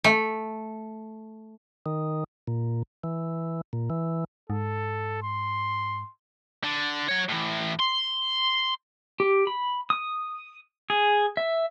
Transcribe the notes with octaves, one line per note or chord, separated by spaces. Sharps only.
A3
D#3
A#2
E3
A#2
E3
G#2 A4
C6
D3
F#3 C#5
A2 E3
C6
G4
B5
D#6
G#4
E5